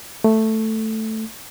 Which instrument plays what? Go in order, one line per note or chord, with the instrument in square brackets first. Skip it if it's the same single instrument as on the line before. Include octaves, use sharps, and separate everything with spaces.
[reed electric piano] A3